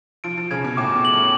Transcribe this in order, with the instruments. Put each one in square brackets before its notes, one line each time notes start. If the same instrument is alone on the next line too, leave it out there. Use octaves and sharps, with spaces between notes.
[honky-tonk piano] F3 [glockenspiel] D7
[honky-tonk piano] F3
[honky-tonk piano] C#3 [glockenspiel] G#6
[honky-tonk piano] B2
[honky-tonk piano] A2 [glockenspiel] D6
[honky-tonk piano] B2
[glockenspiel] F#7
[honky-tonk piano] A2